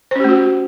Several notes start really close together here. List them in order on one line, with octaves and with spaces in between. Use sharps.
C5 C#4 G4 A3 F#4